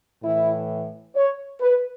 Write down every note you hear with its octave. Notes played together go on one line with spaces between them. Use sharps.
A2 E3 E4
C#5
B4